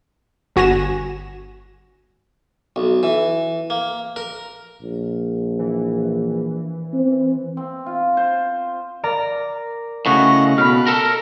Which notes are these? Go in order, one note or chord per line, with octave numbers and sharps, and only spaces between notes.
G1 F#4 G#5 A#6 E7
B1
E3
A#3
A#4
A#1
E3
C4
C4
F4
C5
A#4 D5 A#5
A2 C#3 F#4 D#5 F#5
B2 F5 B5 F6 F#6
A4 A#4